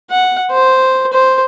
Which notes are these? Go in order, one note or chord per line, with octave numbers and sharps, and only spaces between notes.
F#5
C5
C5